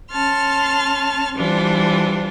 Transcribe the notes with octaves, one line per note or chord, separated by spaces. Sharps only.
C#4 A5 C6 F6
E3 G3 D4 F4 C5